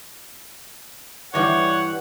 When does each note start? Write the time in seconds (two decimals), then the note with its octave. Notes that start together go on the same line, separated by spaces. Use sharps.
1.34 G2 E3 G3 C#5 F#5